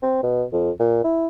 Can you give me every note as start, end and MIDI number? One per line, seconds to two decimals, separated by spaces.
0.03 0.23 60
0.23 0.44 47
0.52 0.71 41
0.79 1.03 46
1.04 1.27 64